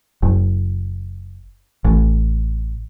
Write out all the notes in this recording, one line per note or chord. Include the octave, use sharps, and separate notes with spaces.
F#1
A1